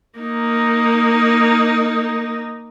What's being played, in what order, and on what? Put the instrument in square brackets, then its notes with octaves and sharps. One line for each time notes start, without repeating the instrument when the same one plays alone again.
[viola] A#3 D#4